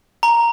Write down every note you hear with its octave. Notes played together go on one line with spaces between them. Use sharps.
A#5